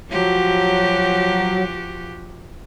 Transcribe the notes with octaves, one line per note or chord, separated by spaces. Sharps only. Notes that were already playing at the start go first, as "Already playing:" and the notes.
F3 F#3 F#4 G4